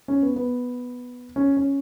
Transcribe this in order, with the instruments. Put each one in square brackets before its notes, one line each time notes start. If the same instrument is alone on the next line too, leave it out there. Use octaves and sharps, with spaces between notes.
[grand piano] C#4
B3
B3
C#4
C#4